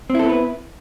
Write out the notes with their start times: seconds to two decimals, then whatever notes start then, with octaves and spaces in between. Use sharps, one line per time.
0.10 C4
0.15 E4
0.19 A4
0.24 B3
0.29 B4